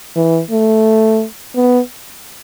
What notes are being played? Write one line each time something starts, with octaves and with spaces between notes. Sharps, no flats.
E3
A3
B3